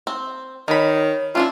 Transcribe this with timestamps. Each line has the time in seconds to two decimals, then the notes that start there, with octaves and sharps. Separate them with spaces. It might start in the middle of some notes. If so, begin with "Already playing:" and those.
0.07 C4
0.68 D#3 D#4 C#5 B5
1.35 E3 C#4 D4 E4 F4